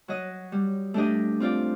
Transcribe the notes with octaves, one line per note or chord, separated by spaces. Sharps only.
F#3 D#5
G3
A3 D4 G4 D#5
C4 F4 D5